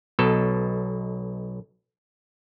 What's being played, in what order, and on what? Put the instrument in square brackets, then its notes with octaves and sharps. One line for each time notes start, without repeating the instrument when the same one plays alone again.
[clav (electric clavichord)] B1 B2 A4